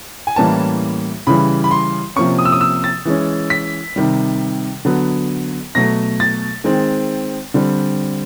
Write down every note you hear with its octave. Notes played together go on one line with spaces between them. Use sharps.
G#5
A2 E3 G3 A#3 C#4 A5
C#3 E3 G3 B5
B5
C6
C3 F3 A#3 C#4 C#6
D#6
E6
D#6
E6
A6
E3 G#3 C#4
B6
C3 D#3 G3
D3 F#3 B3
B2 F#3 A3 A#6
A6
D#3 G#3 C4
D3 G3 C4